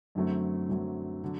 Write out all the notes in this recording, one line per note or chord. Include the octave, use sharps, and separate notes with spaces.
F#2 D3 F#3 A3 C4
F#2 D3 F#3 A3 C4
D3 F#3